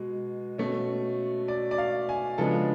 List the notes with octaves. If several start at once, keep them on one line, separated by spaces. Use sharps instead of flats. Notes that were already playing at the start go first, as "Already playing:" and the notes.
Already playing: B2 G#3
B2 A3 C#4
D5
D5
F5
G#5
C#3 F3 G#3 B3 D4 A4